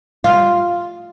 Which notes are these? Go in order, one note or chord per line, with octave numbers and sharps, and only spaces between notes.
F4